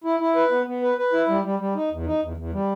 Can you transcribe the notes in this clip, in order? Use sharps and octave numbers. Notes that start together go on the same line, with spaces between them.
E4
E4
B4
B3
B3
B4
B4
E4
G3
G3
G3
D#4
E2
D#4
E2
E2
G3